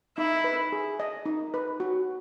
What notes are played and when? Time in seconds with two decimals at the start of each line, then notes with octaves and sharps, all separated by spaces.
0.17 D#4 E4
0.44 B4
0.72 G#4
1.00 D#5
1.26 D#4
1.54 B4
1.80 F#4